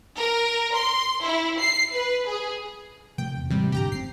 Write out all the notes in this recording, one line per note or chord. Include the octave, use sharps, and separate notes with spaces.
A#4
C6
E4
C7
B4
G#4
C3 F3 A3 G5
E1 E2
A2 C3 E3 G3 G#3
D1 G#2 D3 G4 G5 A#5
F#1 D3 C4 C7